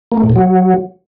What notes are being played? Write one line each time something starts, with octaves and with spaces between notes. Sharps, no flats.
A#3
A3
A2
A#2
F#3